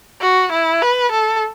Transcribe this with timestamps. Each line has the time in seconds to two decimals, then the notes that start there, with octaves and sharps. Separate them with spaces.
0.21 F#4
0.52 E4
0.82 B4
1.12 A4